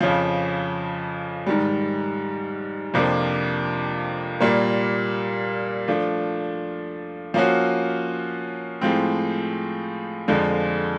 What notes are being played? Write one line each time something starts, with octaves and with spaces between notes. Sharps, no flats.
F2 C#3 F3
G#2 D#3 G3
F2 C3 F3 A#3 D4
A#2 G3 A#3
F3 A3 D4
F3 A#3 C#4 F#4
A2 F3 G#3 C4
F2 D3 F3 G#3